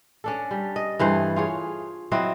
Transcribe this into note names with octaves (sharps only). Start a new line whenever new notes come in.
C#4 D4 A4
G3
D#5
G2 E3 A3 C5
F4 G#4 C#5
F#3 C4 E4 D#5